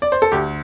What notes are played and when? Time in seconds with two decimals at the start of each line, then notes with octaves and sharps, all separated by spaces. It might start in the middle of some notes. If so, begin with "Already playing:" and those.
0.02 D5
0.12 C5
0.22 A4
0.32 D2 G4